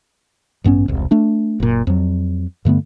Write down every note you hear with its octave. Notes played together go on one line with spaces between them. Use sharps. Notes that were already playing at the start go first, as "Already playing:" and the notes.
A1 G2 B3 C#4
E1 C2
A3 D4
F#1 A#2
F2 F#3
G2 D3 A3 B3